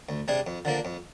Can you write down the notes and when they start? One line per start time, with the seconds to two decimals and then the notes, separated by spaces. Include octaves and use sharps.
0.09 D2
0.28 C3 G3 D4 G#4
0.47 F2
0.65 D3 F3 A#3 D4
0.85 F2